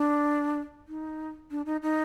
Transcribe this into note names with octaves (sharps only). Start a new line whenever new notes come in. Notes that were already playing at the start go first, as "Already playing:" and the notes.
Already playing: D4
D#4
D4
D#4
D#4